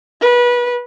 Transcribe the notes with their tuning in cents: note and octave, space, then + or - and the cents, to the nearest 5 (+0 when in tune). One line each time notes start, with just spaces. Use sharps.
B4 -25